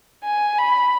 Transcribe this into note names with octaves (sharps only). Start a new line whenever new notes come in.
G#5
B5